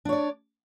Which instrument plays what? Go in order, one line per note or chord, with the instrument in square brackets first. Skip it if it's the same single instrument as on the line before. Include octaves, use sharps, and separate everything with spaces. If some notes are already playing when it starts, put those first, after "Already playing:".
[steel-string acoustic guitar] D4
C#5
D5